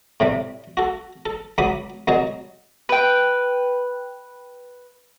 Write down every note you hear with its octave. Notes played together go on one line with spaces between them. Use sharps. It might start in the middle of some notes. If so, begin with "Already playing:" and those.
A2 C3 G3
F#4 A4
A4
C#2 F#3 B5 D6 D#6
C2 F#3 G#4 D#5 A5
B4 G5